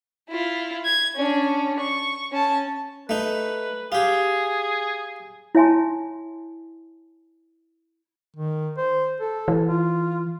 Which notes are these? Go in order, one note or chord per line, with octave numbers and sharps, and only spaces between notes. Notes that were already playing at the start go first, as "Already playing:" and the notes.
E4 F4
G#6
C#4 D4
C#6
C#4 A5
A3 D#4 B4
F4 G4 G#4
E4 C#5 E5 G#5 A5 C6
D#3
C5
A4
E3
F4